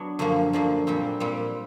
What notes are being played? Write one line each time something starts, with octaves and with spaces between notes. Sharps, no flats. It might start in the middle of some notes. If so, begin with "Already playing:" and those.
Already playing: F#3 B3 D4 F#4
F#2 D3 F3 A#3
F#2 D3 F3 A#3
A#2 G3 C4
A#2 G3 C4